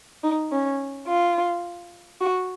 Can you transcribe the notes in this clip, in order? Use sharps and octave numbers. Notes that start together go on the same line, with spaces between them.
D#4
C#4
F4
F#4